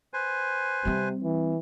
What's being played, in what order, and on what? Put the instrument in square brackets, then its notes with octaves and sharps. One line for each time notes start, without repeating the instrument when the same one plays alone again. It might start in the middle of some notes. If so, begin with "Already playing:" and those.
[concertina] B4 C5 G#5
[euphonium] C3 [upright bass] G3 C4
[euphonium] E3